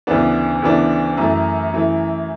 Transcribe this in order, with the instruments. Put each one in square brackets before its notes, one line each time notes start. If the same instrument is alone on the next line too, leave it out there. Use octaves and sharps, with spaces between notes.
[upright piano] D2 C#3 E3 B3 D4
D2 C#3 E3 B3 D4
F#2 E3 A3
F#2 E3 A3